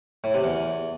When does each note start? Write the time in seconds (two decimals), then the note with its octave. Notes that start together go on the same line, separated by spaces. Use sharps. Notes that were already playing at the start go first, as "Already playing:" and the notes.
0.24 A2
0.34 C3
0.44 E2